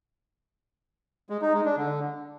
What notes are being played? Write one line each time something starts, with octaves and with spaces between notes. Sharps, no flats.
G#3
D#4
G#3
D4
D3